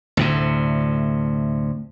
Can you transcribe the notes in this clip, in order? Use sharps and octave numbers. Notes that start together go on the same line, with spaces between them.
D2 A2 C3